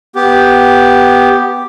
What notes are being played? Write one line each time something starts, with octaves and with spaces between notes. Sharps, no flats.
B3 G4